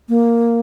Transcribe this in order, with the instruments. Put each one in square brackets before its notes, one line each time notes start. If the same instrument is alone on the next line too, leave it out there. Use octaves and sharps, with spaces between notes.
[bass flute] A#3